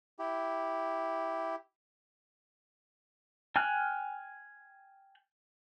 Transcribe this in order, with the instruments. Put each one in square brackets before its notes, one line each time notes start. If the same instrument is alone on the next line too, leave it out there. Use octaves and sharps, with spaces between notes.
[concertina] E4 G4
[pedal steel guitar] G5 G#5 F6 F#6